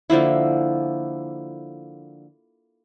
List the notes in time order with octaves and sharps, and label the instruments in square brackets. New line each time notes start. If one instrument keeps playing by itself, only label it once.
[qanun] D3 F3 A#3 E4